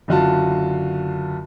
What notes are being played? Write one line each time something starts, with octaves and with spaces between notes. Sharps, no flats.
F#1 D3 F4 F#4 A5